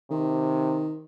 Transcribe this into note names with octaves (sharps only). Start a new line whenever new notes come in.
C3 D#3